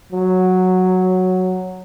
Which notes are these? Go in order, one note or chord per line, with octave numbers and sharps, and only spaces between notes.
F#3